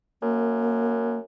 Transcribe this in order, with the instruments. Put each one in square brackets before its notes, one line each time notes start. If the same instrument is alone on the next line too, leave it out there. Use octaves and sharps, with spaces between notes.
[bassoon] F#2 [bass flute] A#3